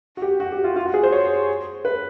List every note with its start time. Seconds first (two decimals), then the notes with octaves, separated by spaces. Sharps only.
0.17 F#4
0.22 G4
0.40 F#4
0.52 G4
0.64 F4
0.76 F4
0.86 F#4
0.94 G#4
1.03 C5
1.12 C#5
1.85 B4